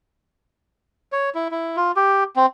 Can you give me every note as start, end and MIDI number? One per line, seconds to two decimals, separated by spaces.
1.12 1.30 73
1.35 1.48 64
1.51 1.76 64
1.77 1.92 65
1.96 2.24 67
2.36 2.46 60